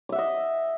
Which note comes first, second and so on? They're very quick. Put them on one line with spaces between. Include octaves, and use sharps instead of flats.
D6 E5 F#5 D#5